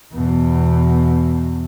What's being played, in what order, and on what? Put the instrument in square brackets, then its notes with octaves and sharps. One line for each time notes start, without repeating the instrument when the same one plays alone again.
[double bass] E2 B2